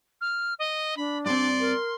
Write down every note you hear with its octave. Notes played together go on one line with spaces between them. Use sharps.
F6
D#5
D4 B5
G2 C4 D5 C6
A#4